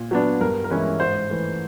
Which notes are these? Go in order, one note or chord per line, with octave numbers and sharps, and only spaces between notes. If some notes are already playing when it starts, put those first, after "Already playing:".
Already playing: A#2
F#3 B3 D4
G2 A#4
A#4
E3 G#3 C#4 E4 B4
G#2 C5
E3 A3